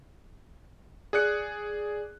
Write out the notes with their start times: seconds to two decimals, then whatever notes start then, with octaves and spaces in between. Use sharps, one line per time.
1.13 G#4 D5 F#6 C#7